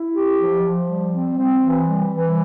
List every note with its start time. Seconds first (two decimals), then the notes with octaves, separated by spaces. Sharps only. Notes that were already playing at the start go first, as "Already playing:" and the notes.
Already playing: E4
0.14 G4
0.38 F3
0.62 F3
0.88 G3
1.12 C4
1.37 C4
1.62 E3
1.86 G3
2.10 E3